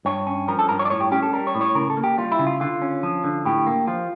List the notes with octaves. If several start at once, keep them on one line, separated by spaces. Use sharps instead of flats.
G2 C#5
C#4
F3 A#4
A4
G2 A#4
C#5
D5
A2 C#5
G4
C#4 G4
A4
G3 A#4
C#5
A2
C#5
C#3 A#4
A4
A#3
G4
G3 F4
E4
C#3
F4
D3 F4
C#4
F3
D3
A2 G4
A#3
F3 F4